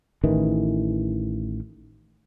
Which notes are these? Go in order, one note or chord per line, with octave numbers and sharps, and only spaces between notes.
A1 D#3 E3